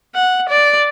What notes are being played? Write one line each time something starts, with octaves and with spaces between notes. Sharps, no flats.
F#5
D5